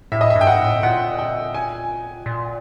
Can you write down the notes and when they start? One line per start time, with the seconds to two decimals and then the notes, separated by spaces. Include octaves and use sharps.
0.12 A2 E5
0.21 D#5
0.30 E5
0.36 G2
0.41 G5
0.47 G#2 F#5
0.59 A2
0.83 A#2 F#5
1.19 G5
1.54 G#5
2.26 A#2